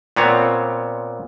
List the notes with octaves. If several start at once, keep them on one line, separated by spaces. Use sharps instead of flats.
A#2 B3 C4 C#5